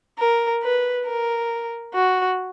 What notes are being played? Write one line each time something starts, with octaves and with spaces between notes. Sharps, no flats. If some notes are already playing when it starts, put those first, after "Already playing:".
A#4
B4
A#4
F#4